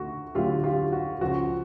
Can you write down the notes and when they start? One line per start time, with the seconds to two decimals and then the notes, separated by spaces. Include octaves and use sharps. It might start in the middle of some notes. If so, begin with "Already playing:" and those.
Already playing: D2 D3 A3 F#4
0.35 D2 D3 F#3 A3 F4 G4
0.63 F4 G4
0.92 F#4
1.21 C#2 C#3 F3 F#4